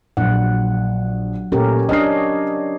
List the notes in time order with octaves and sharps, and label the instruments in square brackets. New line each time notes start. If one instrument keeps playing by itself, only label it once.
[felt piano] A#1 [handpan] F#3 F#5
[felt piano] A#2 A3 [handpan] C#4 G4 A#4
[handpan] D4 C#5 D#5 [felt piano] D#6 F6 C7